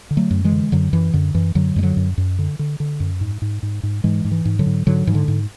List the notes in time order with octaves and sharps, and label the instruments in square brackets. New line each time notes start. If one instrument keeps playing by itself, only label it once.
[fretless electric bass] D3
F#3 A3
F#2
E3 G#3
D3
F#2 D3 F#3
F#2 E3
F#2 D3
F#2 E3
F#2 D3 F#3
F#2 G#3
D3 F#3
F#2
F#2
D3
D3
D3
F#2
G#2
G#2
G#2
G#2
G#2 E3 G#3
G#2
E3
G#2
D3 F#3
G#2
G#2 D3 F#3
G#2 E3
D3
G#2